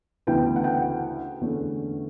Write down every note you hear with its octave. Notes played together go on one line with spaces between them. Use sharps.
D2 C#3 E3 B3 D4 G5
F#5
G5
F#5
E2 D3 A3 C#4